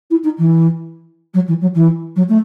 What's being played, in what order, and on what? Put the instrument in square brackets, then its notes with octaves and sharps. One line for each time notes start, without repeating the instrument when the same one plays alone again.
[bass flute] E4
D#4
E3
F#3
E3
F#3
E3
F#3
A3